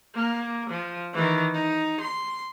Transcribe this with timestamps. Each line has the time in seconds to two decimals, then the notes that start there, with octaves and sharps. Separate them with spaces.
0.14 A#3
0.70 F3
1.14 D#3 E3
1.54 D#4
2.00 C6